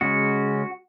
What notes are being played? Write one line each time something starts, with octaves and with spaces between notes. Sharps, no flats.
C#3 G#3 C#4 F#4